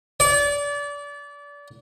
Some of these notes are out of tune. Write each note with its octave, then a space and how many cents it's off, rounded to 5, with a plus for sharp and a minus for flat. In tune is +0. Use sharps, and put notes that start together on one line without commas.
D5 -30